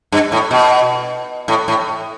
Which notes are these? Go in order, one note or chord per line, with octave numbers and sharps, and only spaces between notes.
G2
A2
B2
A2
A2